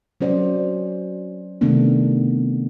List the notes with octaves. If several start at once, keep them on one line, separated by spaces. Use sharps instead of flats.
F#3 C#4 C5 D5
C3 D#3 A3 B3 D4